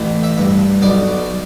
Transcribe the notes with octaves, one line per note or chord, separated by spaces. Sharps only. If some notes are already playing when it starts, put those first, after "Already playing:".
Already playing: A1
E5
G2
B1 D5